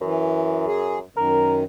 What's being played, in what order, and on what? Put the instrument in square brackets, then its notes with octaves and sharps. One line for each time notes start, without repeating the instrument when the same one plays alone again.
[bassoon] F#2 [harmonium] E3
[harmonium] G#4
[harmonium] F#2 D#3 [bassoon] A#4